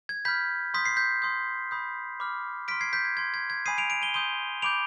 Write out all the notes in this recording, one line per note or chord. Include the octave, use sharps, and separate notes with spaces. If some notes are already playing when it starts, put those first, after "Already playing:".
G#6
B5 F6 G6 B6
C6 D#6 G6 B6
C7
G6 B6
C6 D#6 G6
B5 D#6 G6
B5 D6 F6
C6 F6 B6 D7
G#6 C7
G6 B6
G#6
C6 G6 G#6
G#6
G#6
G#5 B5 D#6 G6 C7 D#7
D7 F7
D7 F7
D#7 G7
C6 D#6 G6 D#7 G7
B5 D6 G6 D7 F7